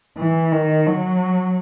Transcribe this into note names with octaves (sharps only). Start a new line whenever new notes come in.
E3
D#3
F#3